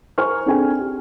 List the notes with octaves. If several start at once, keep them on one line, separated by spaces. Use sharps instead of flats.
A#4 C5 G#5 C#6 F6
C4 D4 G#4 A4 G#5
G4